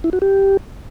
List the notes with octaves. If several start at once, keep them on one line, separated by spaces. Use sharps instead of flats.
E4
F#4
G4